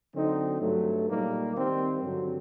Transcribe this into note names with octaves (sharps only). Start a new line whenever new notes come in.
D3 F#3 C4 D#4
G2 F#3 A3
A#2 G3 A#3 D#4
D#3 G3 C4
G2 D3 F#3